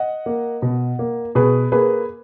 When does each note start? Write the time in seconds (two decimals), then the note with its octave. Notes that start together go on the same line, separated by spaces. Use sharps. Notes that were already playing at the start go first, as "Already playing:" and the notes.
Already playing: D#5 F#5
0.26 A#3
0.62 B2
0.99 A#3
1.35 B2 G#4 B4
1.72 A#3 G#4 B4